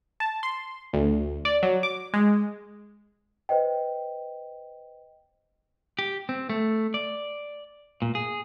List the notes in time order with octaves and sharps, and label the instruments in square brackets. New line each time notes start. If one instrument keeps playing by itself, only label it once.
[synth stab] A5
C6
D2
D5
F#3
D6
G#3
[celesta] B4 C5 D#5 G5
[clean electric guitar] G4
C4
A3
D5
A#2
G#4